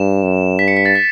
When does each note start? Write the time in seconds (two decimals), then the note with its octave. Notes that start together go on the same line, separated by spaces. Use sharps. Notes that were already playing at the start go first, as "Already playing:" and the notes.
Already playing: G2 E7
0.23 F#2
0.59 G2 B6
0.68 C#7
0.77 B6
0.86 A6
0.95 B6